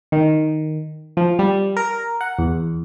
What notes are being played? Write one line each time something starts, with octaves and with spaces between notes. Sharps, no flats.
D#3
F3
G3
A#4
F#5
E2